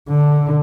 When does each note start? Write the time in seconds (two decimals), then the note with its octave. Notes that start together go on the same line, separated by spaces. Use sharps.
0.09 D3